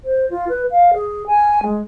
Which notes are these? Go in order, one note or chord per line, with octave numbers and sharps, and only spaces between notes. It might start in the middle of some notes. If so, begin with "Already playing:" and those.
C5
F4
B4
F5
G#4
G#5
G#3